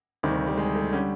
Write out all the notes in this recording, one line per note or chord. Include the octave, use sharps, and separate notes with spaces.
D2 C3 D#3 G3
G3
G#3
A3
D3 G3 C#4